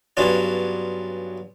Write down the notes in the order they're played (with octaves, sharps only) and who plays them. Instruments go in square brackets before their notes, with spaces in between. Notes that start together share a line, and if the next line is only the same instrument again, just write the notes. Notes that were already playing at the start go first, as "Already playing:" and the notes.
[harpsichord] G2 F#3 B3 C#4 D4 F4